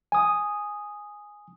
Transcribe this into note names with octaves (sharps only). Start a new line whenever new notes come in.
G#5 D#6